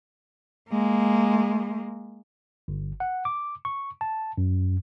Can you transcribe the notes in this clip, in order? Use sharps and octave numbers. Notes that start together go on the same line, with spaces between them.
G#3 A#3
G1
F#5
D6
C#6
A5
F#2